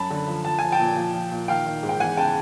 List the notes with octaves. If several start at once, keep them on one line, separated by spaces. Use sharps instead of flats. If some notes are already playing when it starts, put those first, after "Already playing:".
Already playing: F#2 A5 B5
D3
F3
F3 A5
F3 G#5
G5 A5
A#2
F3
F3
A#2
D#3 F5 G5
D#3
G#2
G5
E2 F#5 G#5
C#3 G5 A5